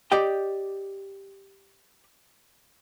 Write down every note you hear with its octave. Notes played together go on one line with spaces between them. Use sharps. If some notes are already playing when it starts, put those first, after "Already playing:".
G4 D5 D#5 G5